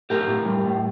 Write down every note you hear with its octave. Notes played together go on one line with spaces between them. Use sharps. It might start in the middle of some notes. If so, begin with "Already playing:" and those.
A2 G4 A#4
A2
G3
A2